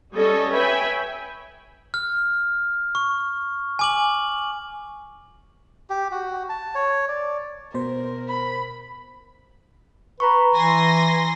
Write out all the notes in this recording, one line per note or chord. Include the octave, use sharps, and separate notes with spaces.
G3 C#4 A4 C#5 D#5
B4 C#5 E5 G5 G#5 B5
F6
C#6
G#5 D6 F#7
G4
F#4
A5
C#5
D5
B2 A#4 C5
B5
B4 A#5 B5 C#6
E3 G#5 C6 A#6